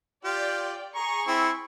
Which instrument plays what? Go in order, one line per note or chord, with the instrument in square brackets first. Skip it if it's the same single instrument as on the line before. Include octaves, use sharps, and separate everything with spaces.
[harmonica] F4 G4 [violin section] D5 G5
[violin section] G#4 C#6 [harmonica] A#5
[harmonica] C4 [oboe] E4